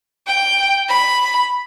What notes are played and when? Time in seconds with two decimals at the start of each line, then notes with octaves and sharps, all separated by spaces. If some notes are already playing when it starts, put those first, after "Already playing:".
0.27 G5
0.89 B5